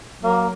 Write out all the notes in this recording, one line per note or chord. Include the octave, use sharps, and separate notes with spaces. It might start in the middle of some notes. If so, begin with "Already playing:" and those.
F#3 A#3